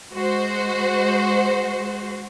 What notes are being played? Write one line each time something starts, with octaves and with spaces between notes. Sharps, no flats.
G#3 F#4 C5